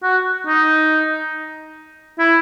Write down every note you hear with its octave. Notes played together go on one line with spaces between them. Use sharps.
F#4
D#4
E4